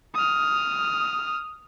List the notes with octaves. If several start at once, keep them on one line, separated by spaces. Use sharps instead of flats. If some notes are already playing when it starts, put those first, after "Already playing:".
D#6 F6